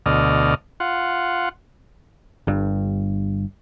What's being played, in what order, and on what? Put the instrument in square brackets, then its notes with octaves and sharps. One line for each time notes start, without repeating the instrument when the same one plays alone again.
[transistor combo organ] D2 B2 D5 D#5 F6
F4 F#5
[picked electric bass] G1 G2